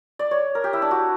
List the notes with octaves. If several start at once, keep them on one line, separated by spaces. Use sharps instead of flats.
D5
C#5
A#4
G4
E4
D4
F#4